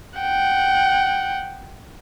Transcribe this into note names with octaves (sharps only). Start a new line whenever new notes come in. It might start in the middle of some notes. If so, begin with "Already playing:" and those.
F#5 G5